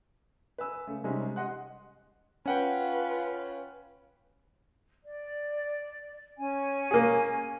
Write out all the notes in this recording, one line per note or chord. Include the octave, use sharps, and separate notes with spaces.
B4 G#5 E6
C#3 A3
C3 G3 G#3 C#4 D#4
G4 D#5 F#5 C6 F#6
C#4 F4 B4 F#5 G5
D5
C#4 G#5
A#3 G#4